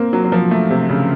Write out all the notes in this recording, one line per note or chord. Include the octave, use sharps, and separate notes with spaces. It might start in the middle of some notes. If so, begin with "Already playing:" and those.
Already playing: A#3 C4
F#3
F#3
F3
A3
C3
C#3